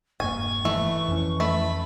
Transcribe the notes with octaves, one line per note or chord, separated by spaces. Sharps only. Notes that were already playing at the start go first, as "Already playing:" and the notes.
E1 G2 A#3 G#5 C#6
E3 A3
F2 C#4
A3 B5